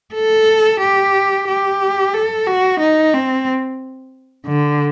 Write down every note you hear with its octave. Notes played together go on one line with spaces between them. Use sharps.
A4
G4
G4
A4
F#4
D#4
C4
D3